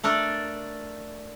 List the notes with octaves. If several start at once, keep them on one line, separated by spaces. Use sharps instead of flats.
A3 D4 A4 A#4 D5